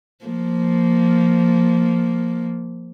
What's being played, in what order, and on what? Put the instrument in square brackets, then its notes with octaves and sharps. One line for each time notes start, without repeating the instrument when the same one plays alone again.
[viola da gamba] F3 A#3